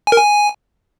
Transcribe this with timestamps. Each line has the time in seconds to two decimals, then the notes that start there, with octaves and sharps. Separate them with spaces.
0.07 G#5
0.12 A#4
0.17 G#5